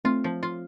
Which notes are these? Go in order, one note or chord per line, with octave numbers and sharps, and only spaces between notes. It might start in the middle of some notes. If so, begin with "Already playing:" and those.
A3 C4 F4
F3
F4